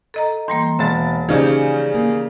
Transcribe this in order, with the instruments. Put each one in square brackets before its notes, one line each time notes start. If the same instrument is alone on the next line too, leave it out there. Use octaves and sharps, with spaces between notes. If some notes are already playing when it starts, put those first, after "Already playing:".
[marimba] A4 D#5 A#5
[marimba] E3 G3 A#3 [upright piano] C6
[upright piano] E1 A6 [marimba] E5
[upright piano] C#3 D#4 [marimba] F3 G4 G#4 [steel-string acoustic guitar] C#4 C5 D5
[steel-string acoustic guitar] A#3